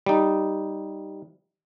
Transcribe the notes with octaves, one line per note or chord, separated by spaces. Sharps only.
G3 D#4